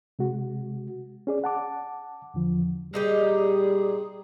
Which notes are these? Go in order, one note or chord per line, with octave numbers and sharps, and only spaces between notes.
C3 G#3 F#4
C#4 G#4 D5
F#5 A5 D6
E2 D3 F3
A#2 G3 D#4 G4 G#4